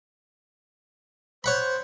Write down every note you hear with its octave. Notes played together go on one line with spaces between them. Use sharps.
C5 C#5 F#5 B5